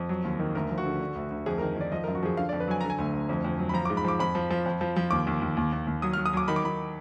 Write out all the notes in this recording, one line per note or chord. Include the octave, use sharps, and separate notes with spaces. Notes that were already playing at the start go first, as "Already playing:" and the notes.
Already playing: F2
F#3
D#2
D#3
D2 A#4
F3
F#4
D3
D3
D2
D2
F2 G#4
A#4
D#3
D#3 D5
F3 D#5
A#4
F#2
F#4
F3 G#4
D3 F5
D5
F2
B4
F#3 G#5
D3 A#5
G#5
D2
D2
F2
F2
F#3
B5
F3 A#5
D6
G#2
B5
F3 D6
F2 B5
F3
F3
F2
F3
F3
D#2 D6
D#2
D#2
D#2
D#2
D#2
F#3 D#6
F6
F#3
D#6
F#3 D6
D#3 B5
D6
D#3 B5